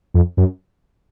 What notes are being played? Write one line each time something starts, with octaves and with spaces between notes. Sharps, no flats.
F2
F#2